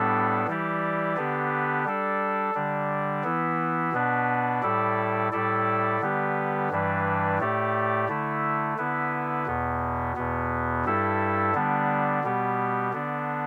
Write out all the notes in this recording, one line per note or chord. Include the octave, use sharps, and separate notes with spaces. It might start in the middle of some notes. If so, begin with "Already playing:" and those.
Already playing: A2 G3 B3 D4 A4
E3 G3 E4 G4 D5
D3 B3 D4 G4 B4
G3 D4 A4
D3 G3 D4
E3 B3 E4
B2 B3 D4 B4
A2 G3 E4 A4 D5
A2 G3 E4 A4 D5
D3 G3 B3 G4 B4
G2 E3 G3 D4 B4
A2 A3 G4 D5
D3 A3 E4
D3 B3 E4 B4
E2 B2 B3
E2 B2 B3
G2 G3 E4 A4
D3 G3 B3 D4
B2 G3 B3 G4
D3 B3 D4